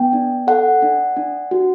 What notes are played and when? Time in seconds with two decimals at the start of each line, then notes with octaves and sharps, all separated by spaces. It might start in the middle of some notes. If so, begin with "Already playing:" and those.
Already playing: B3 G5
0.13 D4
0.47 A4 F#5
0.82 D4
1.17 D4
1.51 F#4